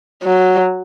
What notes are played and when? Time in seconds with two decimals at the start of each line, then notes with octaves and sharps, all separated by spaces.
0.24 F#3